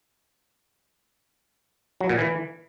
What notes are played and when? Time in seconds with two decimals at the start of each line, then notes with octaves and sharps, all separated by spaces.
2.01 F#3
2.09 A#2
2.18 E3